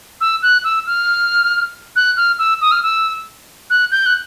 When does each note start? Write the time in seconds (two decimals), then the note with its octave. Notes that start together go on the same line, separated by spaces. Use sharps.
0.21 E6
0.43 F#6
0.64 E6
0.87 F6
1.96 F#6
2.17 F6
2.39 E6
2.61 D#6
2.72 F6
2.83 E6
3.70 F#6
3.91 G6
4.06 F#6